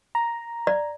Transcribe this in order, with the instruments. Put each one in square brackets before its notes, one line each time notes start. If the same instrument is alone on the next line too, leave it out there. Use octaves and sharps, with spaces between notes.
[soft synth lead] A#5
[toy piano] D5